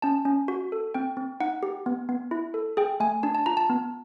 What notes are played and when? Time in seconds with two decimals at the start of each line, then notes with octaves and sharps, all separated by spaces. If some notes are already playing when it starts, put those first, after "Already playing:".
0.02 C#4 A5
0.25 C#4
0.48 F#4
0.72 A4
0.94 C4 G5
1.17 C4
1.40 D#4 F#5
1.63 G4
1.86 B3
2.09 B3
2.31 E4
2.54 A4
2.77 G#4 G5
3.00 A3 G#5
3.23 D4 A5
3.35 A5
3.46 F4 A#5
3.57 A5
3.70 B3